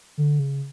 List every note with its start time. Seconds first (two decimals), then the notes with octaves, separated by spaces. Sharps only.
0.18 D3
0.39 C#3